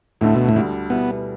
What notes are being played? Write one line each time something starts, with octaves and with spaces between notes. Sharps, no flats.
D2 A2 D3 A3
B2
A2
D2 D3 G3
B2 G3 B3 E4